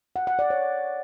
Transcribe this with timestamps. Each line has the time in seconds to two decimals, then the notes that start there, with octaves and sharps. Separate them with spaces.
0.16 F#5
0.27 F#5
0.39 D5
0.50 C#5